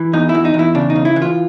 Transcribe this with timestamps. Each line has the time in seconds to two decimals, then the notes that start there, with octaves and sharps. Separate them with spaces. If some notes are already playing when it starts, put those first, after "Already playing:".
Already playing: E3
0.13 E2 D#4
0.29 E4
0.35 E2
0.45 D#4
0.54 E2
0.59 E4
0.75 C#3 D4
0.90 D#4
0.96 C#3
1.05 E4
1.16 E3
1.22 F4